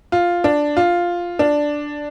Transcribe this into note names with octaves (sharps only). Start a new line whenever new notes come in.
F4
D4
F4
D4